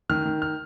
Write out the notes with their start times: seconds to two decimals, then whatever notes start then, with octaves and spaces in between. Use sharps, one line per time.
0.09 D#3 F6
0.25 D#3
0.42 F6